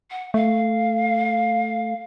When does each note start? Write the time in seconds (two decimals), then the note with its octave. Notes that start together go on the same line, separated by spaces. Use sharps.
0.11 F#5
0.34 A3 F5